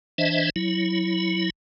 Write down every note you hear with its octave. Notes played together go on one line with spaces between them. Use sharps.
E3 D4 C5 D#5 E5
F#3 E4